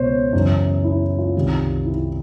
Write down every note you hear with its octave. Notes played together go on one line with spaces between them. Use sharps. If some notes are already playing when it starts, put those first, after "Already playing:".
Already playing: C#2 B2 C5 C#5
F#2 C#3 E3
E4
F4
C2 C3 D#3
E4